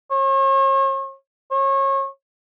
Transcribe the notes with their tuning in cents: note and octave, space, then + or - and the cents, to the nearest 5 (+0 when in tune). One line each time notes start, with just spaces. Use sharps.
C#5 -40
C#5 -30